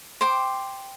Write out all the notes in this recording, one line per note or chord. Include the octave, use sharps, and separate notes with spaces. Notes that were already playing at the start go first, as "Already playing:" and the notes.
C5 G5 D6